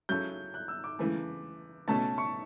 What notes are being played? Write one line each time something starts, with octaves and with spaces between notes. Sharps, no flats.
C#3 F#3 C#4 E4 A4 G6
F#6
E6
D6
C#3 E3 A3
B2 A3 C#4 A5
C#6